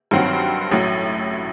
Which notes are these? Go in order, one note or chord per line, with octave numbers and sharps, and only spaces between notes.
G2 D#3 F#3 C4 F#4
A1 A2 F#3